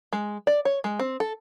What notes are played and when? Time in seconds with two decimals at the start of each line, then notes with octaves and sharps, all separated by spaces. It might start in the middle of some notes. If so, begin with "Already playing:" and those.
0.13 G#3
0.47 D5
0.65 C#5
0.84 G#3
0.99 C4
1.20 A4